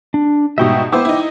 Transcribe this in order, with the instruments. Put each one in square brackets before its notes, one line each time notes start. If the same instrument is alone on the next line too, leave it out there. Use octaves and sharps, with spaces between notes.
[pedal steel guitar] D4
[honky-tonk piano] G#2 B2 G3 [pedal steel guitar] E5 G5 D#6
[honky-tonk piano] B3 E4 C5 [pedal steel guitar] G5 D6 E6
[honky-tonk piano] D#4 E4